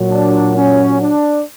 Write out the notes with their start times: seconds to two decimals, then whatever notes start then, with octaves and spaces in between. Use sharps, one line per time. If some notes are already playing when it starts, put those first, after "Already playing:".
Already playing: A#2 F#3
0.09 D4
0.55 C#4
1.01 D4